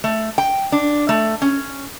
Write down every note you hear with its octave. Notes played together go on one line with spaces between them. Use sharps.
A3
G5
D4
A3
C#4